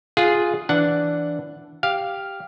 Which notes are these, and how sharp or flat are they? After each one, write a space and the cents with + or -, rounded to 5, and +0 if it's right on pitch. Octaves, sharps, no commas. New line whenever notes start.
F4 +0 G#4 +0 F#5 +0
E3 +10 D4 -5 F#5 +0
G4 +0 F5 +0